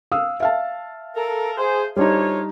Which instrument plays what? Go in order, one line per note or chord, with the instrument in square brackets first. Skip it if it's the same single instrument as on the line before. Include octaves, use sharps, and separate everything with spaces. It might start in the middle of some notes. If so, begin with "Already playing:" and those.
[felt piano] F5 D#6 E6
E5 F5 A5
[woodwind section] A4 A#4
G#4 C5
[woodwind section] D2 F4 C#5 [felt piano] G3 D4 D#4